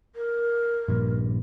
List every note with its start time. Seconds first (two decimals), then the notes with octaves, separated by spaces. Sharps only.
0.16 A#4
0.88 A#1 G2